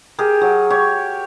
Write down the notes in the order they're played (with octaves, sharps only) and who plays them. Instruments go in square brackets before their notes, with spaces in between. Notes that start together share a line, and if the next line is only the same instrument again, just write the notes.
[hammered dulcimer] G4 G#4 A#4
F#3
G4 C#5